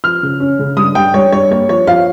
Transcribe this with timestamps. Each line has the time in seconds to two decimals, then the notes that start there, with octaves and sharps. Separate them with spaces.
0.04 F3 F6
0.23 C#3
0.40 C#4
0.59 C#3
0.77 G2 D#6
0.95 G2 G5
1.14 G2 C#5
1.32 G2 C#5
1.51 A#3 C#5
1.69 F3 C#5
1.87 F3 F5